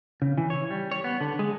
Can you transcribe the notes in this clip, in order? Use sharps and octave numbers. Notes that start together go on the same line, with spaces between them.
C#3
E3
C#5
G3
C#5
B3
D3
G#3